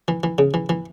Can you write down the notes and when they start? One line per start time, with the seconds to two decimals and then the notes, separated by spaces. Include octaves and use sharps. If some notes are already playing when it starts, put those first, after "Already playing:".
0.08 E3
0.23 E3
0.38 C#3
0.54 E3
0.69 E3